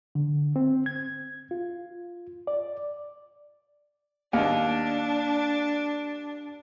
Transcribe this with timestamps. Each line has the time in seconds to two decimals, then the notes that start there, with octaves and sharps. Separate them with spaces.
0.15 D3
0.56 C4
0.86 G#6
1.51 F4
2.47 D5
4.33 D#2 D4